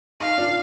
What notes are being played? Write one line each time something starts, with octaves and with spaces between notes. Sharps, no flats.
D#4 F5
D4 F4